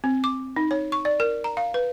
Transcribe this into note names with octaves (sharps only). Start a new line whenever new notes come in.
C4
D6
D#4
C#5
C#6
D5
A#4
A#5
F5
B4